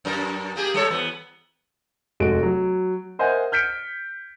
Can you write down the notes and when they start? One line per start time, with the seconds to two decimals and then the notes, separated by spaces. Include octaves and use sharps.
0.05 F#2 A#4
0.56 A#3 G4 G#4
0.74 G3 A4 C#5
0.91 E2 B3
2.20 F1 G#3 F#4 A4 D7
2.43 F#3
3.19 A#4 C5 D#5 E5 F#5 G#5
3.52 F6 G6 B6 C#7 D7